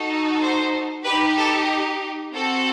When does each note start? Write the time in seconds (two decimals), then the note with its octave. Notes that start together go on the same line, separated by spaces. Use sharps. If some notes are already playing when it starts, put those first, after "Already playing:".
Already playing: D#4 F#4 A4
0.41 C5
1.05 D#4 G4 B4
1.37 A4
2.32 C4 F#4 A4